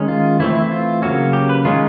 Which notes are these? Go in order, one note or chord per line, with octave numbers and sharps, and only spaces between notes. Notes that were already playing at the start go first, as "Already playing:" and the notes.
Already playing: D#3 G#3 C#4
F4
E3 A3 C4 E4
E4
F4
C#3 F#3 A#3 C#4 F#4
G4
B4
D#3 G#3 C#4 F4